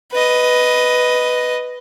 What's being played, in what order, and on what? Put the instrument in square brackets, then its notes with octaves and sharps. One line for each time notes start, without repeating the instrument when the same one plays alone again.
[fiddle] B4 D#5